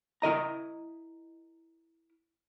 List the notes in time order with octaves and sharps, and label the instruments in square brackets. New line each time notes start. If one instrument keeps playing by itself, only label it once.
[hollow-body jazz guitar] E4 A#4 D#5 A#5